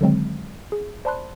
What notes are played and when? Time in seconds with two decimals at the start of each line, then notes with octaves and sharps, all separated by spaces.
0.01 D3 D#3 F#3 G#3 C4
0.72 G#4
1.05 C5 D5 A5 B5 C6 F#6